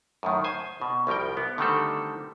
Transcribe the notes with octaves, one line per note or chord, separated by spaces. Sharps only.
F#2 A2 D#3
C5 G#5
B2
C2 F3 G3 A#4 G5
B3
D3 D#3 G3 A3 C4 A4